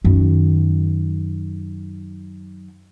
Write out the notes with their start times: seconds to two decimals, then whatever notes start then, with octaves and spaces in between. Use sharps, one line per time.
0.04 F#2 D#3